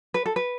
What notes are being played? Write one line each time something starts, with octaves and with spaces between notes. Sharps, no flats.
B4
A4
B4